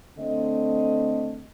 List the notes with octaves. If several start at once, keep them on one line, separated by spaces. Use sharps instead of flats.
D3 A3 C4 D#5